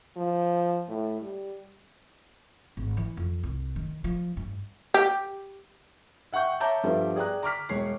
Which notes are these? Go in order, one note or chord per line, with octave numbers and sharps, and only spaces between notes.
F3
A2
G3
G#1
E3
F2
C2
D#3
F3
G2
G4
E5 F#5 G5 C#6 G6
C#5 E5 A5 A#5 D6 G6
G2 F3 G3 B3 A4 E5
G#4 D5 G5 A#5 F#6
A#5 D6 F6 B6
E1 C#5 C7